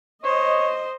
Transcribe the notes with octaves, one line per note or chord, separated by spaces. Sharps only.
C5 C#5 D#5